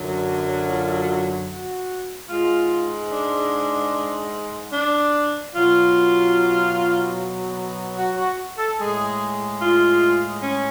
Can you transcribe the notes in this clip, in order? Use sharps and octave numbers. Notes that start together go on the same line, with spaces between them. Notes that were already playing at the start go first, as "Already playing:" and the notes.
Already playing: F#2 D3 F#3
D4
F4
F#4
G#2 G#3 F4
D4
D4
B2 F#3 F4
F#4
F#4
A4
A2 G#3 G#4
F4
C#4